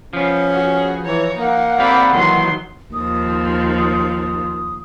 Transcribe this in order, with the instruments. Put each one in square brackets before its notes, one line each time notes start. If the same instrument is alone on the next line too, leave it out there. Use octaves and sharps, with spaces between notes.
[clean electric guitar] F3 B3 [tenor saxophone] C#4
[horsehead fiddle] F#4 G#4
[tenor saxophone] E3 [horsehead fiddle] C#5 A#5
[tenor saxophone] A#3 [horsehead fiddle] D#4 F#5
[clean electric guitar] C4 G4 F5 [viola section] D5 B5
[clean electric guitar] D#2 E3 [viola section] D#3 F#3 C6
[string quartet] D#2 F3 [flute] D#6